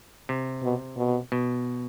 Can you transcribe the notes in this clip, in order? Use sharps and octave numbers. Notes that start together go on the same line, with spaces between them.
C3
B2
B2
B2